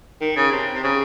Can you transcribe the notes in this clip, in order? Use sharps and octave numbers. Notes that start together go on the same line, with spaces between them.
D#3
C#3
C3
C3
C#3